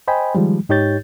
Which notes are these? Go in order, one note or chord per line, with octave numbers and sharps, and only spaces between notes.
C5 D#5 G5 G#5 B5
D#3 F3 G3 G#3
G#2 D#4 G4 C#5 G6 A6